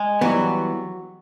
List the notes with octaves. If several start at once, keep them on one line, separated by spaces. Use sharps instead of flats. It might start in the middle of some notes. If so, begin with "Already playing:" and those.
Already playing: G#3
E3 F#3 G3 B3